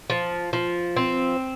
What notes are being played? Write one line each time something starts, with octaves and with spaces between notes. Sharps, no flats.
F3
F3
C4